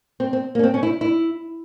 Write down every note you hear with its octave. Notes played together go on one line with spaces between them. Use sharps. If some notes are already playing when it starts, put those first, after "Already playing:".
C4
C4
A#3
C#4
C4
C#4
E4
E4